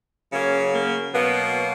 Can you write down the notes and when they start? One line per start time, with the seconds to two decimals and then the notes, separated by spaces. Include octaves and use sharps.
0.33 C#3 F#3 A#3 C#4
0.73 A#3
1.13 B2 F#3 A#3 B3